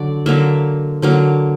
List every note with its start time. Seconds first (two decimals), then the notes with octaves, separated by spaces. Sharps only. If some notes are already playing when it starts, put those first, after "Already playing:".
Already playing: D3 F#3 D5
0.26 D3 F#3 A#3 E5
1.02 D3 F#3 A#3